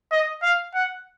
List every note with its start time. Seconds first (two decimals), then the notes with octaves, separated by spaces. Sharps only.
0.12 D#5
0.43 F5
0.75 F#5